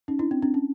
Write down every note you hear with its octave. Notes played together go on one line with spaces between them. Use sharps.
C#4 D#4
D4 E4
C4 D4
C4 D4
C#4